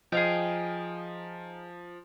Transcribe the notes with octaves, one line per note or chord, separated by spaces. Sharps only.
F3 D#4 G#4 F5 G5